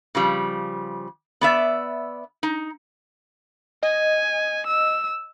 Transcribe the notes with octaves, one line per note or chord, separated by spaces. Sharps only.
C#3 F3 G3
B3 D5 E5
D#4
D#5 G#5
E6